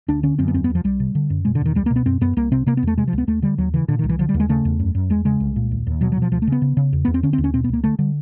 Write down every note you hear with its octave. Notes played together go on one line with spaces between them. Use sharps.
D2 D4
D3 C#4
F#2 C4
B3
E2 C4
B3
E2
F3
C2 G3
C3
D3
F#2
B2 G#3
D3
E2 D#3
C#2 G3
A#3
B2
B3
F#2 C4
F#2 B3
C2 A#3
C3 C4
C3 A#3
B3
E2 A3
C3 G#3
F3
C#2
B3
D#2 A3
D3 G3
D#2 F#3
C#3 E3
A#2 D3
D#3
C2
E3
D3 F3
G3
D#2
G#3
C#3 A3
E2
F#2
F#2
E2 G#3
C#3 G#3
C2
A#2
D#2
D#2
B2 F#3
F#3
B2 F3
D2 F3
A3
C#3 B3
C#3
C#3
E2
E2 B3
C4
D3 C#4
C4
D#2
C#4
B2 C4
B3
C#2 A#3
D3 A3
D3 G3